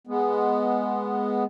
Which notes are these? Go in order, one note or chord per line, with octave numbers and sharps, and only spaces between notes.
G#3 B3